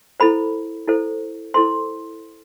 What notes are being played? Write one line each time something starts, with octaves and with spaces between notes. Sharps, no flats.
E4 A4 C5 B5
E4 A4 C5
E4 A4 C5 C6